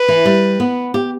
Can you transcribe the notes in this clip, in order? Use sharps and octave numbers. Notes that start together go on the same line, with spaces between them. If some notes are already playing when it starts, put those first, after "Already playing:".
Already playing: B4
E3
G3
B3
G4